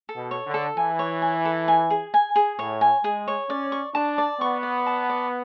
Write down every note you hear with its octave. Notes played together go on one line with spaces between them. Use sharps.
A4
B2
C#5
D3
A4
E3 G#5
C#5
G#5
A4
G#5
G#4
G#5
G#4
A2 C#5
G#5
G#3 G#4
C#5
C#4 D5
C#6
D4 A5
D5
B3 C#6
D5
A5
D5